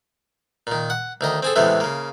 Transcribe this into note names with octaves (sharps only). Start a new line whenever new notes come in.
A#2 D#3
F#5
D2 D#3 D#5
C4 G#4 A4
A2 C3 E3 G#3 A3 B3
C#3 A#3